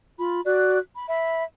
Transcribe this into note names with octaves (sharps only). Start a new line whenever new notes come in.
F4 B5
F#4 D5 F#6
B5
E5 B5